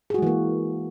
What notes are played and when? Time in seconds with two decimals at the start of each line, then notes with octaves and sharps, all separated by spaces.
0.10 G#4
0.14 F#4
0.18 G#3
0.22 E3
0.26 A#3